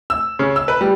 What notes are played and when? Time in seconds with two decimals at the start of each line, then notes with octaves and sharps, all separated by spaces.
0.10 E6
0.39 C#3
0.56 E6
0.68 B4
0.81 G3